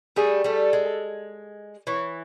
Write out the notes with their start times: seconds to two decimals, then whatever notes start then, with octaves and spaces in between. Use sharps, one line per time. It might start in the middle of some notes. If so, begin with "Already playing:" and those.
0.16 G3 A3 G#4
0.44 G3 A3 A4
0.73 G#3
1.87 E3 C#5